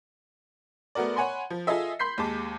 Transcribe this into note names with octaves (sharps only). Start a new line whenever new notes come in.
A3 B3 F#4 A#4 D5
C#5 F#5 G#5 B5 C6
F3
F4 G#4 A4 D#5 E5
B5 C6 G6 B6 C7
D#2 G#3 A5 D6